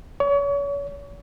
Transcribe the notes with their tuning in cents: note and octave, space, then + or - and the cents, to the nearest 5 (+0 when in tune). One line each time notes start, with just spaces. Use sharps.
C#5 +35